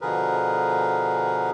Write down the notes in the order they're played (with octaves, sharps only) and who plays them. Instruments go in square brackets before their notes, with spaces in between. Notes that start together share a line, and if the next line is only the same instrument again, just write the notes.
[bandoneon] B2 D3 F3 G#4 A#4 B4